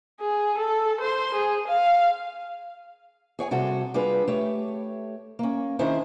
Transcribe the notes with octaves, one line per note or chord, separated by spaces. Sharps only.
G#4
A4
C5 C6
G#4
F5
G#4 C#5 G5 G#5
C3 G3 F#4 G#4 A4
G3 D4 F4 G#4 B4
A3 G4 C#5
A#3 C#4
D#3 C#4 D4 E4 G#4 C5